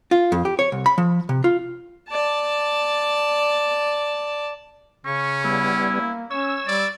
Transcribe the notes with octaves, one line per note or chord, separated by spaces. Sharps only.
F4
F2
G4
C#5
C2
B5
F3
C3
F4
D5 A5
C#3 C#4 C#6
G3 B3 E4
A#3
C#4 C#5 E6
G3 D5